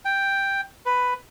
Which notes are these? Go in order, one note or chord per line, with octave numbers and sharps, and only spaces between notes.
G5
B4